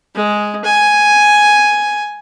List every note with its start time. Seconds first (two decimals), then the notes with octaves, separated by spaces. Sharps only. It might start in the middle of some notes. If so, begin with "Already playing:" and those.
0.15 G#3
0.65 G#5